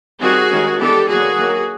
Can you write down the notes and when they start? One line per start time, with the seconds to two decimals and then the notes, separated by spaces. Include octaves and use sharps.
0.21 D#3 G3 C4 F#4 G#4
0.50 D#3 G#3 C#4
0.79 E3 G#3 B3 D4 G4 A4
1.08 D3 F#3 A#3 F#4 G#4
1.37 D#3 F#3 A#3